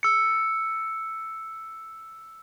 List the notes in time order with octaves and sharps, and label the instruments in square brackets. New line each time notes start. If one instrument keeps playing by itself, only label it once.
[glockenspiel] E6 C#7